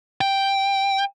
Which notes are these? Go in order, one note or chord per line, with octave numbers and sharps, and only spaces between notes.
G5